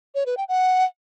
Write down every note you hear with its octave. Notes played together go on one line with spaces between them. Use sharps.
C#5
B4
G5
F#5